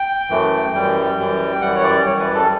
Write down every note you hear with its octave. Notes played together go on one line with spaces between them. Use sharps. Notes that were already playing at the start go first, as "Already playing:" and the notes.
Already playing: G5
F#2 E3 A3
F#2 E3 G3 G5
F#2 E3 G3
F#2 E3 G3 F#5
C#5
D5
F#2 E3 G3 C#5
B4
A4